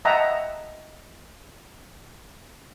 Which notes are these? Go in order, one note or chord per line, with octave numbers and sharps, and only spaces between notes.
D#5 E5 F#5 G5 A5 A#5